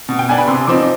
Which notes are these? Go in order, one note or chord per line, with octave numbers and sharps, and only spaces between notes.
B2
G5
B3 D4 G#5
B5
C3 C6
F3 C4 D#4 D6